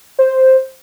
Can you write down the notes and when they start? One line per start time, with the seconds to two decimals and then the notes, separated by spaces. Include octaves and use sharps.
0.19 C5